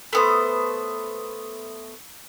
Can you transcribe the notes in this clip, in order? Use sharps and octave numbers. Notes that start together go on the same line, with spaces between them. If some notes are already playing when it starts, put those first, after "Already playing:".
A3 B3 C5